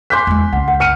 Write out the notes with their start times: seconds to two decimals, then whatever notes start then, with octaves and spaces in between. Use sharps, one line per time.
0.10 G#5 C6 D6 F#6 G6 B6
0.27 E2 G#3
0.53 C#2 F#5
0.68 F#5
0.80 F6 C#7 D#7